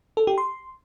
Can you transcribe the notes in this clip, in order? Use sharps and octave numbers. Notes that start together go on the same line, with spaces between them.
A4
G4
C6